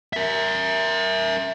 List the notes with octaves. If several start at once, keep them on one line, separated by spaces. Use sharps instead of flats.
A#4 E5